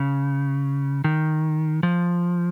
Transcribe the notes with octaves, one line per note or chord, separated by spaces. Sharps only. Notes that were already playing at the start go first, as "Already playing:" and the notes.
Already playing: C#3
D#3
F3